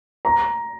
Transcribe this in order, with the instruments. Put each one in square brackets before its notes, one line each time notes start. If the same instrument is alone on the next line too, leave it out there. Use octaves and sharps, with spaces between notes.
[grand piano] A#5